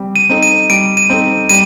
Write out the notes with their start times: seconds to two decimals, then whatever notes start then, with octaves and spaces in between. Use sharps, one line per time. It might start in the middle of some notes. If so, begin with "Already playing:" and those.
Already playing: G3 C4
0.16 D#7
0.29 C4 D#4 A4
0.43 D#7
0.70 G3 D7
0.97 D#7
1.10 C4 D#4 A4
1.50 G3 D#7